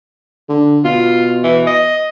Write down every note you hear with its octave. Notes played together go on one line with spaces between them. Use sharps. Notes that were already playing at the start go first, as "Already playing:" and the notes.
D3
B2 F4
E3
D#5